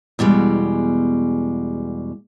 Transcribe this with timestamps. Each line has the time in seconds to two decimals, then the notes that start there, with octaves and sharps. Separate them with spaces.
0.19 E2 B2 G3 G#3